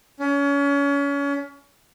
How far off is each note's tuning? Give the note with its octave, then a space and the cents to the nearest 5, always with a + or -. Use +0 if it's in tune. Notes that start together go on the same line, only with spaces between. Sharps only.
C#4 +30